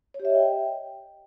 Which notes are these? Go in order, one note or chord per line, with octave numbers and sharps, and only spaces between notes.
C#5
G4
E5
D#5
G5